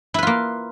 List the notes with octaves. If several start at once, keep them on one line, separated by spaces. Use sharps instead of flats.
A#3 E4 F4 B4